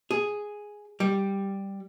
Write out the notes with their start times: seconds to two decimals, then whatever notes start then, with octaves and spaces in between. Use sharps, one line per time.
0.11 G#4
1.00 G3